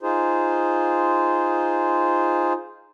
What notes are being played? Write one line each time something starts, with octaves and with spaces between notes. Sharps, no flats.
D#4 F4 G#4 C5